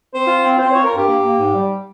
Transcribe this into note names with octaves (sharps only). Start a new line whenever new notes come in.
C4 C5
F4
C4
C4 C5
C#5
F4
A#4
G2 G4
A#3
A#3
G#2
G3